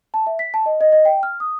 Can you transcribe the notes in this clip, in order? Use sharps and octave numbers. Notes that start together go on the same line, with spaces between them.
A5
E5
B6
A5
D#5
D#5
D#5
G5
F6
D#6